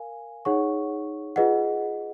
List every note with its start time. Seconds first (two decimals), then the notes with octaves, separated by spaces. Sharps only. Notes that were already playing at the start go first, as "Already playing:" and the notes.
Already playing: A#4 F5 G#5
0.45 D#4 G#4 C#5 F#5 C#6
1.36 F4 G#4 B4 D#5 F#5